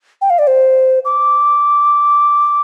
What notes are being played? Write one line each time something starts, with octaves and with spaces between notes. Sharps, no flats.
G5
F5
D5
C5
D6